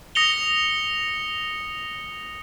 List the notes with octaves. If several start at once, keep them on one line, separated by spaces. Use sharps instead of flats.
D#6 A#6 C#7 F7 G7